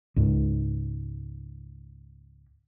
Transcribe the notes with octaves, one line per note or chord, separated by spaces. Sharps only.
C#2 G#2